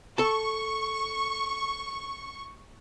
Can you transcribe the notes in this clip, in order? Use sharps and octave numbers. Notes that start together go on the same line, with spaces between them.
A4 A5 C#6